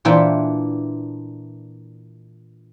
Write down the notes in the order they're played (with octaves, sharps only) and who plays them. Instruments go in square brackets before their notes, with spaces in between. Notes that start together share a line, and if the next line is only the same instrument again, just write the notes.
[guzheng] A#2 E3 D4 E5 G5